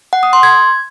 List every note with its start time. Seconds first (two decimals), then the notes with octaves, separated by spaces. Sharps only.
0.13 F#5
0.23 D#6
0.33 C6
0.43 G#6